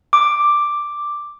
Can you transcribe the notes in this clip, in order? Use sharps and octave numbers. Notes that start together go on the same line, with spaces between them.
D6